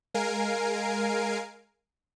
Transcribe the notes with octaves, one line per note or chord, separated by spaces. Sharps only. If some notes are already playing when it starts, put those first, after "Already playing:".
G#3 A#4 F5 G#5 C7 D7